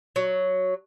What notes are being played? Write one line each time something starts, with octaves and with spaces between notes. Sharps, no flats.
F#3